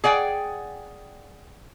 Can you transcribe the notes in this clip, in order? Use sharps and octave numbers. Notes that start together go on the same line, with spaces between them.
G#4 D5 F#5 G5